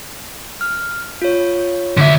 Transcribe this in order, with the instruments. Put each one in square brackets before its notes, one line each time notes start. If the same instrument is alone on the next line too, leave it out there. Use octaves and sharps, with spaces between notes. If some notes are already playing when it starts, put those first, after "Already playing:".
[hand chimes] F6
F4 C#5
[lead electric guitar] D3 E5